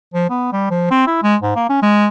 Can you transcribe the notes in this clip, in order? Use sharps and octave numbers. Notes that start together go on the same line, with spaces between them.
F3
B3
G3
F3
C4
E4
G#3
G#2
A#3
C#4
G#3